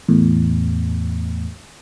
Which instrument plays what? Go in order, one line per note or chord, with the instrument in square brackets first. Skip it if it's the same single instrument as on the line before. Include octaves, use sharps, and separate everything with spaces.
[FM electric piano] E2 A2